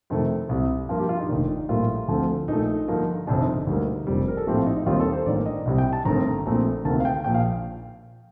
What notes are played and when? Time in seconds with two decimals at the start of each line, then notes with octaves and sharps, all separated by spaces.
0.10 F2 C3 D#3 A3
0.49 C2 C3 G3
0.89 G2 F3 A#3 F4
0.99 G4
1.09 F4
1.19 D#4
1.29 F1 D#2 D#3 D4
1.49 D#4
1.69 A#1 A2 G3 A#3 F4
2.08 D2 D3 F3 A3 C4
2.48 A#1 A#2 A3 D#4
2.88 G2 D3 F3 A#3
3.27 G1 F2 C3 F3 D4
3.41 D#4
3.54 D4
3.67 D2 D3 G3 A#3 D#4
4.07 F1 F2 D#3 G3
4.28 A#4
4.37 A4
4.46 A#1 A2 F3 C4 G4
4.57 F4
4.66 D#4
4.76 D#4
4.86 D#2 D#3 G3 C4 F4
5.00 A4
5.13 C5
5.26 A1 G2 D#3 A#3 D5
5.46 D#5
5.65 C2 C3 G3
5.78 G5
5.93 A5
6.05 G1 G2 D#3 A3 C4 A#5
6.46 A#1 A#2 F3 A3 C4
6.85 D2 C3 D#3 A#3 A5
7.00 F5
7.05 G5
7.24 A#1 A#2 F3 G5
7.34 F5